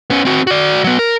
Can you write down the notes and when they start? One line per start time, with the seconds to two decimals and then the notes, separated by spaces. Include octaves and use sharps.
0.10 B3 C#4
0.25 C4 F#4
0.47 F#4 D5
0.84 F#3 B3
0.99 A#4